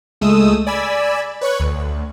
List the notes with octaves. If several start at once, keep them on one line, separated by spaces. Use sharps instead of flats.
C#2 G#3 A3 D#6 E6
D5 G#5 B5 E6
B4 C#5 C#6 F#6
D2